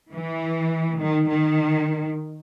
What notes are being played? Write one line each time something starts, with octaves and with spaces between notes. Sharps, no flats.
E3
D#3
D#3